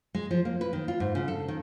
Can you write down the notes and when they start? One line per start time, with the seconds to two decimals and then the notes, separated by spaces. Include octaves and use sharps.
0.14 G#3
0.31 F3
0.45 A#3
0.61 B4
0.73 D#3
0.88 F4
1.00 G#2
1.15 C#3
1.28 A4
1.48 D#3